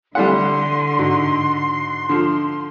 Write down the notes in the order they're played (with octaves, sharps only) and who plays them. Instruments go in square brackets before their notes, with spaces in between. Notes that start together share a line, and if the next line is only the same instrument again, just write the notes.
[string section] D3 [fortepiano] G3 A3 F#5 [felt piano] E4 [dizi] C6
[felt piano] G#2 D#4 F#4
[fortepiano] D3 F3